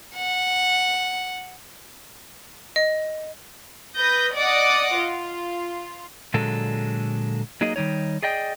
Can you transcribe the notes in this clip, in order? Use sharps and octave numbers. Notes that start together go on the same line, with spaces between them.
F#5
D#5
B4 D#6 G6 A#6
D5 D#5 F#5 D6 D#6
F4
A#2 D3 F#3 G#3 A4
F#3 A#3 D#4 G#4 D#5
D#3 G3 D#4 C#5
G#4 D5 D#5 G5